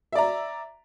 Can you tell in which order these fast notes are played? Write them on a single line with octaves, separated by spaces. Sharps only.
E5 D5 A#5